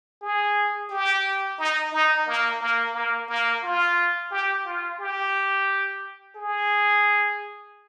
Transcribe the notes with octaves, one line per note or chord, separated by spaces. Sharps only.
G#4
G4
D#4
D#4
A#3
A#3
A#3
A#3
F4
G4
F4
G4
G#4